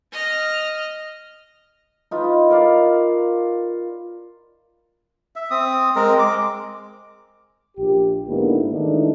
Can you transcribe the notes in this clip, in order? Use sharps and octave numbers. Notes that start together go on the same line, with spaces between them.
D#5 F6
D#4 F4 B4
A#4 D5 F5
E5
C4 D#6
G#3 C4 A#4
G#3 D6
A#1 G4
G#2 D3 A#3 B3 D#4 E4
D#3 E3 G#3 A3 D4 D#4